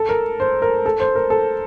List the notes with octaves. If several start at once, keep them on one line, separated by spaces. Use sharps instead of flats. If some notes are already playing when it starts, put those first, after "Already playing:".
Already playing: A4
A#4
C5
A#4
A4
C5
A#4
A4